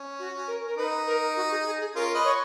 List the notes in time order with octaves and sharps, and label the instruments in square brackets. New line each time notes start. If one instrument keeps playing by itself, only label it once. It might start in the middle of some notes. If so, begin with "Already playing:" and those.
Already playing: [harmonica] C#4
[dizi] F#4
A#4
A#4
[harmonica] D#4 [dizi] B4
[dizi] A#4
F#4
G#4
G#4
G#4
[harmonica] C#4 F4 [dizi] A#4
[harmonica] B4 D#5
[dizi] C#5